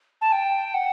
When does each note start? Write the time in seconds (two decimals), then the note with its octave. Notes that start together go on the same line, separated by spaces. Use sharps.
0.21 A5
0.32 G5
0.74 F#5